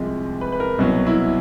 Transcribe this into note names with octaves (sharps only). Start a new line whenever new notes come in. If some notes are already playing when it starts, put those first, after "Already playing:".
Already playing: C2 C3 F3 G#3
B4
B4
A#4
C2 B2 F#3
E4